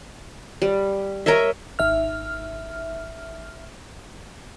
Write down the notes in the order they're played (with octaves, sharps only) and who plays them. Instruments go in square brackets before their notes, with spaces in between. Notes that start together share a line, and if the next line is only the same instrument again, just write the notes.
[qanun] G3
A#4 C#5 D#5 E5
[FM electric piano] G#1 E5 F6